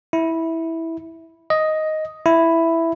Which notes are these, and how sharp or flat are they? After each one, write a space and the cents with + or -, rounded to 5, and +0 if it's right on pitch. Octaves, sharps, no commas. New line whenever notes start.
E4 -10
D#5 +5
E4 +5